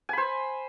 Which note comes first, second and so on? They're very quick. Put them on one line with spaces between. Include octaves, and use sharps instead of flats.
G#5 B5 C5